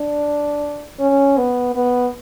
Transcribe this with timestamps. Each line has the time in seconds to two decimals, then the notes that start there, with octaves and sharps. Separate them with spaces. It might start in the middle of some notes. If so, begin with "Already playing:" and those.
Already playing: D4
0.99 C#4
1.37 B3
1.75 B3